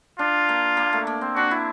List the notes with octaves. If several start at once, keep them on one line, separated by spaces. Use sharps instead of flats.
D4 F4
A#3
A#3
A3
A#3
C4
D4 F#4
E4